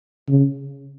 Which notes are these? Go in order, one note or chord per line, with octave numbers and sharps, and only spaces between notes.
C#3